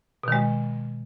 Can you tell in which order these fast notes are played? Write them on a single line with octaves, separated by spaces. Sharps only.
B2 D#3 G#3